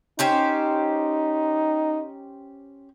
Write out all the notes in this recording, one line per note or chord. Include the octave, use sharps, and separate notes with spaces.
C#4 D#4 G4 C5